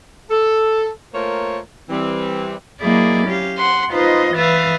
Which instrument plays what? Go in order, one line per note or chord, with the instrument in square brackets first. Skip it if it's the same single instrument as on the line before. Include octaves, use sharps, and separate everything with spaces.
[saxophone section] A4
A3 A#3 F4 A#4 C5 C#5
E3 G3 C4
[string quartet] F#3 A#3 E4 G#4 D5 D#5
C#4 G4 F5
F#5 C6
D#4 F4 B4 C5 D#5 C6
E3 B4 E5 F5 D#6 A6